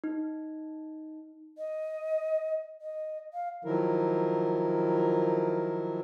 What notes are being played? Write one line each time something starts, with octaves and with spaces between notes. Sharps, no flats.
D#4
D#5
D#5
F5
D#3 F3 F#3 E4 A#4